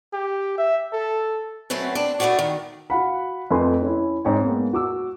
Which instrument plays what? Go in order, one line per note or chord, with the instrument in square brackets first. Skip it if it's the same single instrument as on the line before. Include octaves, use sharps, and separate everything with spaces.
[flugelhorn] G4
E5
A4
[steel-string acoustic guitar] F#2 F#3 A3 C4 B4
C4 D4
A3 B3 C4 D4 F#4
D#3
[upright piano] F#4 F5 F#5 B5
F2 A3 B4 G#5 C6
C#4 E4
G#2 C4 C#5 G5
G#3 A#3 B3
F#4 D6 E6